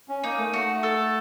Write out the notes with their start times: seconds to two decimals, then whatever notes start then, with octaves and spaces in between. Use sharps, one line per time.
0.09 C#4
0.23 A#3 D#4
0.38 A3
0.53 A3 F#4
0.83 A4